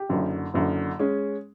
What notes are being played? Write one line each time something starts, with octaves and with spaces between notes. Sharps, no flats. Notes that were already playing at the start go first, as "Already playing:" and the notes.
Already playing: G4
F#1 F#2 D3
F#1 F#2 D3
G#3 C#4